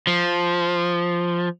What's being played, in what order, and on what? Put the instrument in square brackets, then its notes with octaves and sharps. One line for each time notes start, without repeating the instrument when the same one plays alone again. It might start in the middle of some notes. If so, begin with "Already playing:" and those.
[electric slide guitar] F3